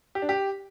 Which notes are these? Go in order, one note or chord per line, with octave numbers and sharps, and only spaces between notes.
G4
D4
G4